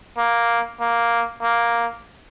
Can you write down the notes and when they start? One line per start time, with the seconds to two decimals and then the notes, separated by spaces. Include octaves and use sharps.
0.18 A#3
0.81 A#3
1.43 A#3